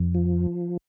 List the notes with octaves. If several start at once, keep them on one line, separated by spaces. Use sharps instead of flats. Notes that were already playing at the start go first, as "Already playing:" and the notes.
Already playing: F2
F3